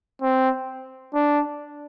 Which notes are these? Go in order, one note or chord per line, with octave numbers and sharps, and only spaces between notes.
C4
D4